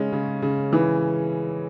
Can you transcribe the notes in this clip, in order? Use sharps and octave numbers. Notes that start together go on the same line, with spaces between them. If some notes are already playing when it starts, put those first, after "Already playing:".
Already playing: C#3 G#3 C#4
C#3
C#3
E3